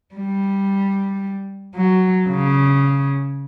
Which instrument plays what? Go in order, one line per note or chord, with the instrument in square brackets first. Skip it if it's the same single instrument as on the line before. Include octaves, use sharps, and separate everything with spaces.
[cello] G3
F#3
C#3